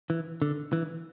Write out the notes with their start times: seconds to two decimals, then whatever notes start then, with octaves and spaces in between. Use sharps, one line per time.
0.10 E3
0.42 D3
0.73 E3